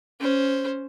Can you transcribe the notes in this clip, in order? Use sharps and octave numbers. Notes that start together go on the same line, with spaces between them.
C#4 C5